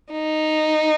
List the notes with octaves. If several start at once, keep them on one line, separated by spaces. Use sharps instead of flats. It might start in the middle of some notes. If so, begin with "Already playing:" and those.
D#4